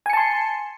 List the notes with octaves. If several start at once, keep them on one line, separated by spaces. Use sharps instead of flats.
G#5 A5 C6 C#7